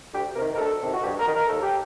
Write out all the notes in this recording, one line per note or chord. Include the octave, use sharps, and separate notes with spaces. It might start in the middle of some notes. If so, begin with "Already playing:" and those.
D2 G4
C3 D#3 A#4
A#4
D2 A4
C3 D#3
F#4
G2 G4
A#4
D#3
A#4
D#2 A4
G4